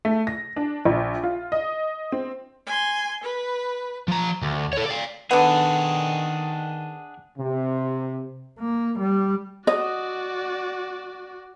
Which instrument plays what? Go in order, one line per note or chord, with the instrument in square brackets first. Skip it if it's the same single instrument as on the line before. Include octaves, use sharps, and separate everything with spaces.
[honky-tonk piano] A3
A#6
D4
A#1
F4
D#5
C4
[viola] G#5 C6
B4
[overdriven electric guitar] F3 A#5
D2
A4 C#5
D5 F5
[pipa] D3 B3 [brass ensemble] D#3 [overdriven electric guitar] D4 G#4 [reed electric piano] F#5
[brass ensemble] C3
[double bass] A#3
G3
[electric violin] F#4 D5 [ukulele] D#5